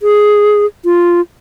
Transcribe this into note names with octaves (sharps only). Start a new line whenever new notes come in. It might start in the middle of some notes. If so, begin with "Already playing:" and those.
G#4
F4